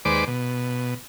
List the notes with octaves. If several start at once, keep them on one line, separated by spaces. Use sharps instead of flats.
D#2 G#3 B4 C5 D5 D6
B2